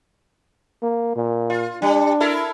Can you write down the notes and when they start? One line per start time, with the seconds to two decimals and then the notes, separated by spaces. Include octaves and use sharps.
0.82 A#3
1.16 A#2
1.50 F4
1.82 G3 D4
2.20 E4 A4 A#4